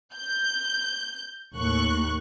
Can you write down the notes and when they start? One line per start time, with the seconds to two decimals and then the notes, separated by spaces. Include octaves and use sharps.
0.15 G6
1.55 D#2 A2 C#6 F#6